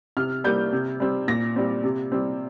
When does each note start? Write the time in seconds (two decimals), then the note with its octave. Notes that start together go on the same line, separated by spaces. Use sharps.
0.17 C3 F6
0.44 G3 A#3 G6
0.73 C3
1.00 G3 C4
1.28 A#2 A#6
1.56 G3 C4
1.84 C3
2.12 G3 C4